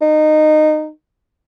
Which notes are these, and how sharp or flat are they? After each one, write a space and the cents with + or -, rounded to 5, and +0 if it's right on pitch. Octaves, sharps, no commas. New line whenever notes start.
D#4 -20